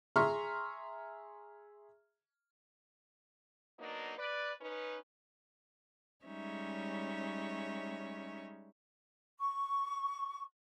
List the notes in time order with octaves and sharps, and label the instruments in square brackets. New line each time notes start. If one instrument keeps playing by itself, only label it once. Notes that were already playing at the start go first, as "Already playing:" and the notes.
[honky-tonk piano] G#4 E5 A#5 C6 C#6 F6
[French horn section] F#3 A#3 B3 D4 D#4
B4 D5
C#4 D#4 B4
[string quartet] G3 G#3 C#4 D#4 C#5 E5
[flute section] C#6